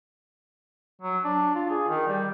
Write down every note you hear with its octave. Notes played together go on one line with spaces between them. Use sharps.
F#3
D4
F4
G#4
D#3
G3